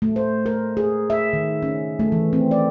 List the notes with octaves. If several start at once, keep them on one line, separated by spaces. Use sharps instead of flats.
A3
C5
A#4
G#4
E5
D#3
C#4
A3
E3
C4
D5